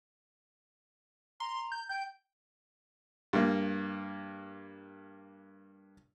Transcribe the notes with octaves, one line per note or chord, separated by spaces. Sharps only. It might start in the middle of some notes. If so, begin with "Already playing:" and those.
A#5 C6
G6
G5 G6
G2 A#3